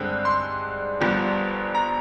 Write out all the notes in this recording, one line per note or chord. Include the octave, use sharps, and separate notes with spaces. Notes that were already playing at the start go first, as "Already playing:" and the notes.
Already playing: G2 D3 G#3 C4
C6
G1 G2 D3 F3
A#5